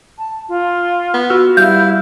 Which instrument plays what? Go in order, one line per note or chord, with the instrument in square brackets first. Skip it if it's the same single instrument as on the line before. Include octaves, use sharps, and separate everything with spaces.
[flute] A5
F4
[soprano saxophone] B3
[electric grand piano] F#4 E6 F6
[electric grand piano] G3 [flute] E4 [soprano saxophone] F5 [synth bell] G6